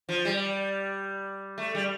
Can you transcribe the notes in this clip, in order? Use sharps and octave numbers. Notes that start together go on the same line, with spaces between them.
F3
G3
A3
G3